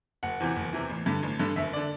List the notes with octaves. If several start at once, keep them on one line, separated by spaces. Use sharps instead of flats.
F#1 F#5
E2 C3 E3
F#1
E2 C3 E3
A1
G2 D3
A1
G2 D3
F#1 E5
D3 D5